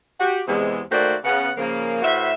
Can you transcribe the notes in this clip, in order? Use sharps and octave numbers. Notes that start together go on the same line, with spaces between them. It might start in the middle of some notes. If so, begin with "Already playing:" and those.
F#4 G4
E2 C3 G#3
D#3 A3 A#3 F#4 C5 D5
C#3 B3 F#5
C#3 F3 A#3
A2 F#4 B4 C5 E5